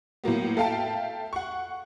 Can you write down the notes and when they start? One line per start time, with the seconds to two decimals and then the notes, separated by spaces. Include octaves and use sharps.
0.24 A2 F#3 A#3 B3
0.57 A4 E5 F5 G5 A5
1.33 F#5 C#6